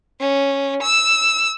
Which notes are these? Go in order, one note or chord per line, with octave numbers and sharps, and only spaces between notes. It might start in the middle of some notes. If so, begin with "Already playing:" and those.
C#4
E6